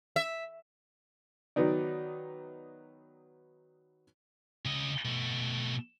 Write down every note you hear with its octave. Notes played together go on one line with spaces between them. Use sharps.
E5
D#3 F#3 B3 D#4 D5
C#3 D#5
B2 A3